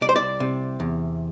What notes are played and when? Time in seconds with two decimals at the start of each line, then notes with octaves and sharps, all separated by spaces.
0.01 C2 D5
0.09 C5
0.16 D5
0.40 C3
0.80 E2